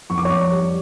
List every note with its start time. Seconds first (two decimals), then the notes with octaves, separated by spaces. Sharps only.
0.10 F2 C#6
0.18 D6
0.25 F2 C#5 C#6
0.52 G3